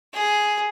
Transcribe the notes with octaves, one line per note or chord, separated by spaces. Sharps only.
G#4